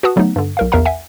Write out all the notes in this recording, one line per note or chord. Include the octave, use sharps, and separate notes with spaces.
F#4 B4 F#5 A5 D#6
D3 F#3 A3 B3 D#4
G2 D3
B1 A#4 F5
A#1 E2 A#4 E5 F5 A#5
E5 F#5 G#5